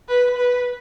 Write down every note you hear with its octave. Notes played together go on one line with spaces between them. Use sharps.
B4
B4